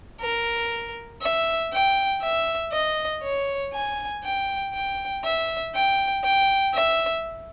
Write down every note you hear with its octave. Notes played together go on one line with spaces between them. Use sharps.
A#4
E5
G5
E5
D#5
C#5
G#5
G5
G5
E5
G5
G5
E5